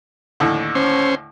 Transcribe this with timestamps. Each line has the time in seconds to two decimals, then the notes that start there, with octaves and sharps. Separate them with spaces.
0.40 D#2 A2 D3
0.75 C#4 C5